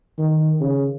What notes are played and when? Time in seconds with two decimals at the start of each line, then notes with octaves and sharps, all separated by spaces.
0.19 D#3
0.60 C#3